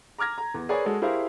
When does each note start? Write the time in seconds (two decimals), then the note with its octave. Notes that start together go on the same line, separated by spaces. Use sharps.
0.18 A#5 D6 F6 G#6 A#6
0.38 A#5
0.54 E2
0.69 G#4 A#4 B4 C#5 D5 G#5
0.85 G#3 F#4 G#4 A4
1.02 E4 G4 G#4 A#4 C5 F5